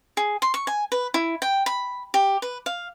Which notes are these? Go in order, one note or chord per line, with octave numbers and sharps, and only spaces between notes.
G#4
C6
C#6
G#5
B4
E4
G5
B5
G4
B4
F5